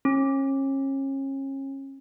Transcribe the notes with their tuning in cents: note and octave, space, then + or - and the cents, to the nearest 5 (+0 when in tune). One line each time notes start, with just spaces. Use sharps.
C#4 -35